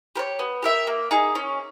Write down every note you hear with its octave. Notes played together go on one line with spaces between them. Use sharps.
G4 A#4 C#5
B3
G4 A#4 E5
A#3
D#4 G#4
C#4